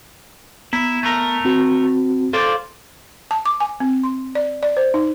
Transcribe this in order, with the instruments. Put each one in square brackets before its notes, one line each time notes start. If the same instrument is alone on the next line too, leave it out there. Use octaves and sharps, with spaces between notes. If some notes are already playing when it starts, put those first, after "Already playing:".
[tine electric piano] B3 A#5 B6 [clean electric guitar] E4
[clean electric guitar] A3 A#4
[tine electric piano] C4 F#4
[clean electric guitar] F4 C5 D5 [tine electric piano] A4
[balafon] A5
D6
G#5
C4
C6
D5
D5
C5
D#4